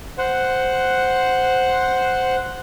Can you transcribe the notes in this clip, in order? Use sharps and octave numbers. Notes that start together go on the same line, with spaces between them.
C5 F#5